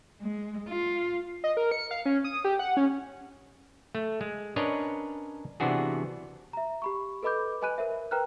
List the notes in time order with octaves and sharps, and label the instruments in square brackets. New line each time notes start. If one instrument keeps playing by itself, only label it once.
[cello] G#3
F4
[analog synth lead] D#5
A#4
C#7
F5
C#4
D#6
G4
F#5
C#4
[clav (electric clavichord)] A3
G#3
C#4 D4 A#4 B4 C#5 D#5
C3 E3 B3 D4 F#4 G#4
[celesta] E5 A#5
G4 B5 C#6
A4 B4 D#5 B5 D6 G6
B4 D#5 G#5 B5 F#6 D#7
A#4 C5 E5
A#4 B4 G5 A#5 F6 F#6